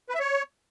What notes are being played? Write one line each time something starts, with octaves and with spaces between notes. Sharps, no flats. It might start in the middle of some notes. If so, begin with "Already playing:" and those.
B4
E5
C#5